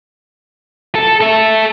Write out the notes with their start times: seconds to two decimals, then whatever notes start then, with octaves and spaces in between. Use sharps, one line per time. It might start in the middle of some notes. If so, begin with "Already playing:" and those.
0.95 A4
1.21 A4 E5